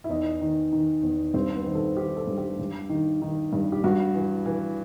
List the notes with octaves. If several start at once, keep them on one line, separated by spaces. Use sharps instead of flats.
E4
E2 D#4
D#3
D#3
E2
G2 C4
B3
D#3
A4
D#3 G4
A4
G2
G4
G2
D#3
D#3
G2
G4
G2 F#4
E3
E3